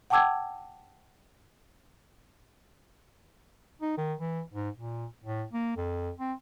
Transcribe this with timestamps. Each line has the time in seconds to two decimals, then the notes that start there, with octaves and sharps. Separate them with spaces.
0.10 F#5 G5 A5 D6 E6 G#6
3.82 D#4
3.98 D#3
4.20 E3
4.54 G#2
4.78 A#2
5.24 A2
5.53 A#3
5.77 F2
6.19 C4